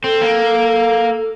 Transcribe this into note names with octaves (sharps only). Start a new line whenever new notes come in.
C4 A4
A#3